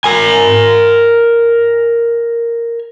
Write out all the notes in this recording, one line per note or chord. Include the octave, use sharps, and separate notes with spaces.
A#4 G#5